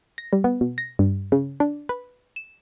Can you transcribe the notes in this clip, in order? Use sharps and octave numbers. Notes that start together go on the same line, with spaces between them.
A#6
G3
B3
B2
A#6
G2
C#3
D4
B4
E7